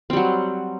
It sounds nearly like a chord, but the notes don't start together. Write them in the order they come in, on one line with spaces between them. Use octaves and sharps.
C4 G3 F#3